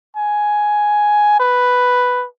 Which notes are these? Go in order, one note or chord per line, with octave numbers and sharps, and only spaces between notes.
G#5
B4